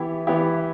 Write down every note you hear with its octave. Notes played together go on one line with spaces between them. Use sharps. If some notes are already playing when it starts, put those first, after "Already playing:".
Already playing: E3 B3 E4 G4
E3 B3 E4 G4